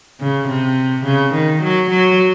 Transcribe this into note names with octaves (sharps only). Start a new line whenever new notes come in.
C#3
C3
C#3
D#3
F#3
F#3